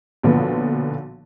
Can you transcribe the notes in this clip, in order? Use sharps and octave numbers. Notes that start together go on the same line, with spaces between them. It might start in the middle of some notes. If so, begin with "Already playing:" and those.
B1 A#2 D3 F3 B3